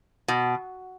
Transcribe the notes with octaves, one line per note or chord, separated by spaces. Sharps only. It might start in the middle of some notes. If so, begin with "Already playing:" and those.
B2